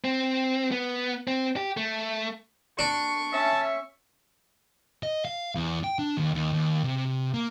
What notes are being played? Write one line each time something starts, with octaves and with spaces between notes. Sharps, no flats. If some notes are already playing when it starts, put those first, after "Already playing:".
C4
B3
C4
G4
A3
D4 C#6
C#4 E5 A5
D#5
F5
E2
G5
D4
D#2
D#2
D#2
C3
A#3